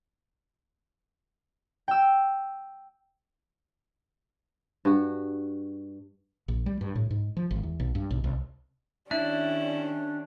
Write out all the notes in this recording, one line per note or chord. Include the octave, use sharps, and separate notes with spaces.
G5 E6
G2 F#4
A#1
G3
G2
A2
G#2
F3
G#1
E2
B1
G2
B1
C2
D#3 G3 C#4 D4 E4 E5